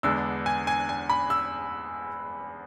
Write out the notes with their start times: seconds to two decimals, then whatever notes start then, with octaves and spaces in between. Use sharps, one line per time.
0.03 E2 D3 G#3 B3 D4 E6
0.46 G#5
0.67 G#5
0.89 G#5
1.10 B5
1.30 E6